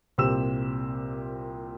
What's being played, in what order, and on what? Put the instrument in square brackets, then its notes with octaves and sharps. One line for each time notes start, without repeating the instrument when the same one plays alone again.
[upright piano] C2 A#2 C4 G4 E6 E7